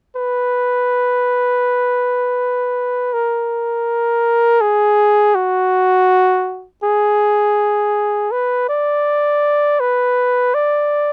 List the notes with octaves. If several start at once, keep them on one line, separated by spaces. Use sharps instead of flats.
B4
A#4
G#4
F#4
G#4
B4
D5
B4
D5